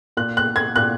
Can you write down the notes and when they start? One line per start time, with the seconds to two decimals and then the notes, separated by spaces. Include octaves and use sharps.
0.17 A#2 F#6
0.37 F#6
0.56 G#6
0.76 A#2 F#6